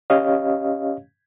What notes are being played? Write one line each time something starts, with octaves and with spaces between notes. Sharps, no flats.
C#4 G4 C#5 D#5 F5